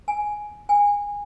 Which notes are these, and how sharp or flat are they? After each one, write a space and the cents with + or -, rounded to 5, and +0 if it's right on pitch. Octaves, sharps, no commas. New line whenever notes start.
G#5 +5
G#5 -20